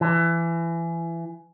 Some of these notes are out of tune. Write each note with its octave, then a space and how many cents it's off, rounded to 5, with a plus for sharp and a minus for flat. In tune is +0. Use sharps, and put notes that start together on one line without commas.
E3 +25